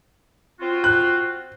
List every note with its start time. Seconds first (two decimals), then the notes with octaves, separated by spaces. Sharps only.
0.60 C4 F4 F#4
0.84 F#6